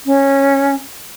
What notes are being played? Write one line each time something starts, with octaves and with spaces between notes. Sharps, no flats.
C#4